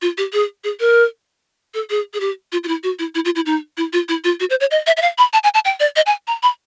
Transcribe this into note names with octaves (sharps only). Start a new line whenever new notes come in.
F4
G4
G#4
G#4
A#4
A4
G#4
G#4
G4
F4
F4
E4
F#4
E4
E4
F4
E4
D#4
E4
F4
E4
F4
F#4
C5
C#5
D#5
E5
E5
F5
B5
A5
G#5
A5
G5
D5
D#5
G#5
A#5
B5